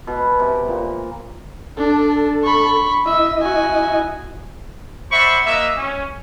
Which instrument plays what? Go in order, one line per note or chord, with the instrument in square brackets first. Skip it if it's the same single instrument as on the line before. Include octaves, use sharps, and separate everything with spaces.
[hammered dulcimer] B2
C3
A#2
[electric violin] D4 [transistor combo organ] A4
[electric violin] B5 C#6
[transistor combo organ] E4 D#5 [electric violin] E5 E6
[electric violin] F#4 G#5
[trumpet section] C5 D5 E5 F#5 B5 C#6
A#3 F#4 D#5 E5
C#4